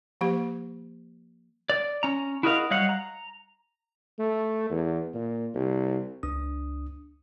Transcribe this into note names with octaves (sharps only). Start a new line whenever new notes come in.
F3 A#3 G4 C5
D5
C#4 A#5
E4 F#4 G#4 A#4 D#5 F5
F#3 G3 D#5 F5 F#5
A#5
A3
E2
A#2
C2
C#2 D4 D#6